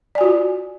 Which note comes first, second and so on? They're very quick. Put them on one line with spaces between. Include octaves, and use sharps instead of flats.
D5 G#5 F#4 F4